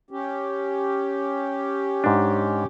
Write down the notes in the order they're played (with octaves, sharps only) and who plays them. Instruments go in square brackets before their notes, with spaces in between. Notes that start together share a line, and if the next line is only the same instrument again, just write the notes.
[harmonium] C#4 G4
[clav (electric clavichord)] G#2 D4